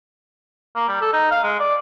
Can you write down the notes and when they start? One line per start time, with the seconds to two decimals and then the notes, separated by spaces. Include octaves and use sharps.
0.76 A#3
0.88 G3
1.02 A4
1.13 D#4
1.31 F5
1.44 G#3
1.60 D5